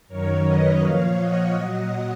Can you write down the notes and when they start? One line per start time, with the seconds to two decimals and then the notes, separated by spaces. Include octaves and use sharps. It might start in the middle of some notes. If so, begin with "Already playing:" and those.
0.08 F#2 D#3 F#3 A#4 C#5
0.45 B4 D#5
0.81 A#2 F3 C#5 F5
1.18 D#5 F#5
1.54 A#2 F#3